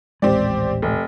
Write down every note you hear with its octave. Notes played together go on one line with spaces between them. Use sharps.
D#1 A1 G#3 C4 G4 D5
F1